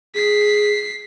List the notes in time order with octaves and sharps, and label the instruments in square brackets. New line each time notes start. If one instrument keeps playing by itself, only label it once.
[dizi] G#4 [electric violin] B6 C7